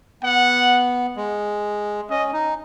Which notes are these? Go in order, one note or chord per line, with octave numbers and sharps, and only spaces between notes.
B3 F#5
G#3
C#4 D#5
D#4